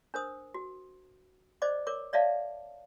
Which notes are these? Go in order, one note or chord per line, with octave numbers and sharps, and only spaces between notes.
D4 A#4 C5 D#6
F#4
C5 D5 D#5 D6
A#4 C#5 D6
C#5 D5 E5 F5 A5